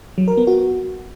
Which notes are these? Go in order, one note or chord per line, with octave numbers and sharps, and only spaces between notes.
F#3
A#4
B3
F#4